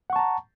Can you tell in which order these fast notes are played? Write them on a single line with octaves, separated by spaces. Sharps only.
F#5 C#6 A5 A#5